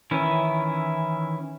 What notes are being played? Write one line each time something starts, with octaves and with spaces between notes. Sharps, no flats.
D#3 E3 C#4 E4